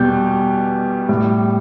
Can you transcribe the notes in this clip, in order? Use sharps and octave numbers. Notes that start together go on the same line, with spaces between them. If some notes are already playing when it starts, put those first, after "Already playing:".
Already playing: E2 B2 G3 G6
A2 G3